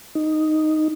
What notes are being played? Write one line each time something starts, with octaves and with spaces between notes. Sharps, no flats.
D#4